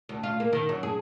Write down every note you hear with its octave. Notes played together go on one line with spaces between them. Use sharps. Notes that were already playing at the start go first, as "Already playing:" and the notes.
D2
F4
A#3
D#3
F#2
G#4